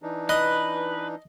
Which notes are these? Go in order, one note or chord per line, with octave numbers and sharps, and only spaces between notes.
E3 D4 D#4
B4 D#5